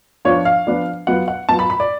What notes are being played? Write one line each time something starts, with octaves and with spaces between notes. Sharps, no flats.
F3 B3 D4 F4 C#5
F5
F3 B3 D4 F4
F#3 B3 F4 F#5
F#5
F#3 B3 F4 A5
B5
B5
D5